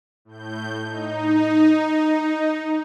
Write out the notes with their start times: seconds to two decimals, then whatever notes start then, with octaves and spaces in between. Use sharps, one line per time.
0.25 A2 G6
0.83 D#4